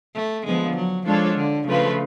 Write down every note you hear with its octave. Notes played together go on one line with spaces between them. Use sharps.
A3
D3 F3 G#3 B3
F#3
F3 G#3 D4 F4 A4 C#5
D3
C#3 F3 A3 F4 B4